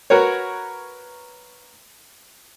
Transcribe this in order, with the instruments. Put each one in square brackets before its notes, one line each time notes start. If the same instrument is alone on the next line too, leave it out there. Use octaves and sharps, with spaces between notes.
[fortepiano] F#4 A#4 B4 C#5